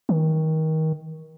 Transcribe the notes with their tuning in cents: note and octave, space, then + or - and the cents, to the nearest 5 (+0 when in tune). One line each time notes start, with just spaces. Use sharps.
D#3 +25